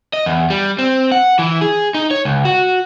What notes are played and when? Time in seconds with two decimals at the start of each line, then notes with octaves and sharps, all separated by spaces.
0.13 D#5
0.26 E2
0.50 G3
0.79 C4
1.12 F#5
1.39 E3
1.61 G#4
1.95 D#4
2.11 C#5
2.25 C#2
2.45 F#4